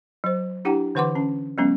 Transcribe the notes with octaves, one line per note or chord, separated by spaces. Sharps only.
F#3 C5
D4 E4 G4 F#5 G5 A#5
D3 E3 B4 F#5 C6 D6
C#4 A5
F#3 G#3 B3 C#4